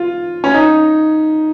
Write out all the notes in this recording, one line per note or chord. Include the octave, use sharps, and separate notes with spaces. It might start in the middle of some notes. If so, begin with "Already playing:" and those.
Already playing: F4
C#4
D#4